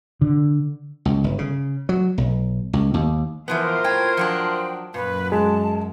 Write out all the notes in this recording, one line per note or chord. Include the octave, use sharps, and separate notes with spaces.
D3
C#2
G1
C#3
F#3
B1
C#2
D#2
E3 F3 B3 F4 A#4 C5
A2 G5 G#6
F3 F#3 D4 G5
F#2 A#2 B4
G#3 A5